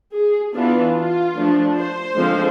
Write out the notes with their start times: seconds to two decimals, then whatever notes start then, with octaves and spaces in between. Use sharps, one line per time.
0.14 G#4
0.55 E3 B3 D4 F4
0.96 F4
1.36 F3 A3 D4
1.77 C5
2.17 D3 F3 G#3 C4